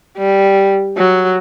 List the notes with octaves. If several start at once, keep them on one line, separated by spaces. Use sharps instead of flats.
G3
F#3